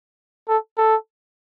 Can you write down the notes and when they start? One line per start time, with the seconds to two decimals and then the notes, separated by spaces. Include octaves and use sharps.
0.48 A4
0.78 A4